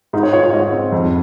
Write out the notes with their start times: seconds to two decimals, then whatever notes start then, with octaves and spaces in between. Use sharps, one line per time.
0.13 G#2 D#4
0.23 C#5
0.33 F4 C#5
0.43 C#5
0.53 G#2 D#5
0.72 C4
0.92 F2